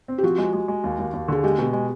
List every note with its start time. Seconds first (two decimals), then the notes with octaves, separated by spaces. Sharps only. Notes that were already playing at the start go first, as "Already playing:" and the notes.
0.08 C4
0.18 G4
0.23 F3 F#4
0.38 G#3
0.53 G#3
0.68 G#3
0.84 D#2
0.99 D#2
1.13 D#2
1.28 D3 G#4
1.44 G#3 G4
1.58 B2 G4
1.73 G#3